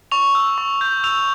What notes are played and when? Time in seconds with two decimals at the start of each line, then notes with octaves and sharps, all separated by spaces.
0.12 C#6 F7
0.35 E6
0.58 C#6
0.81 G6
1.04 E6 F7